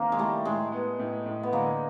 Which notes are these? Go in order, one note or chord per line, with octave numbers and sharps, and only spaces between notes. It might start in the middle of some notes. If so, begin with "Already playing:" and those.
Already playing: D#3 A#3 C4
G#3
G3 A3 E4
A2 G#3
B3
A2
A2
B3
D3 G#3 A#3